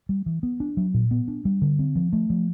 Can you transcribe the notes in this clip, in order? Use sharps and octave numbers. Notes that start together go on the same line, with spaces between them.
G3
E3
B3
D4
F#3
A#2
B3
D4
G3
D3
C4
F3
A3
F3